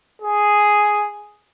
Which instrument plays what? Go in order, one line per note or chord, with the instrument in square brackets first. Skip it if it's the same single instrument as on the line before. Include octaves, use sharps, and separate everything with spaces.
[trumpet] G#4